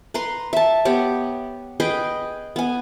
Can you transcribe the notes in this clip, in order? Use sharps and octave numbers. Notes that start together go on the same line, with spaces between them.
B4 A#5 C6
E5 A5
B3 G4 C#5
G#4 B4 D#5 G5
B3 G#5